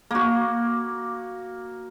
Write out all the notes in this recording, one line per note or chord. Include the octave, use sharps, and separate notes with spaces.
A#3 F#4